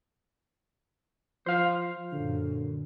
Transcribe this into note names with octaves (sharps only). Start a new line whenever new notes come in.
F3 C5 F5
F#2 A#2 D3